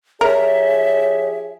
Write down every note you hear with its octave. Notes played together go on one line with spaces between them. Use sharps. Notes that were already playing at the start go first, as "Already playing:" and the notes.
F3 G4 G#4 A#4 C#5 E5